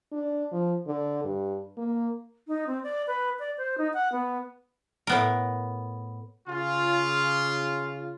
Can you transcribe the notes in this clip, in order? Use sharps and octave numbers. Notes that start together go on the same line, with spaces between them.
D4
F3
D3
G2
A#3
D#4
C4
D5
B4
D5
C5
D#4
F#5
B3
A2 B3 A#4
C#3 F4